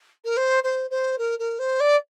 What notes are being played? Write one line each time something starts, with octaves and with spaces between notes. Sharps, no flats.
A#4
C5
C5
C5
A#4
A#4
C5
D5